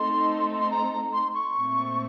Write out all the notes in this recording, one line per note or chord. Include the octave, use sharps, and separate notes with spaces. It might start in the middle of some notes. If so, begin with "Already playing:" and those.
Already playing: A3 C4 D#4 A4 C6
C6
A#5
C6
C#6
A#2 A3 C4